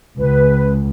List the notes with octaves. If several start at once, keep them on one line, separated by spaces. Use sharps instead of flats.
C#2 B4